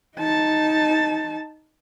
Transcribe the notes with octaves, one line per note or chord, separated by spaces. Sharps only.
D#4 A5